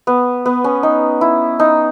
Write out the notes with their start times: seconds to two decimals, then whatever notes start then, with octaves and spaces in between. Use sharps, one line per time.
0.07 B3
0.45 B3
0.64 C#4
0.83 D#4
1.21 E4
1.60 D#4